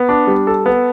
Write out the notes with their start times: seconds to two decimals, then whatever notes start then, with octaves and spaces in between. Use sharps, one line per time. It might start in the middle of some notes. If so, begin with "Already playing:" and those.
Already playing: B3
0.09 D4
0.27 G3
0.47 A4
0.66 B3